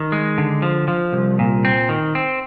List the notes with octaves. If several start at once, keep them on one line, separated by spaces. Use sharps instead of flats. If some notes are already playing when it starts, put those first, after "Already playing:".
Already playing: D#3
G#3
D3
F3
F3
C2
A#2
C4
D#3
C4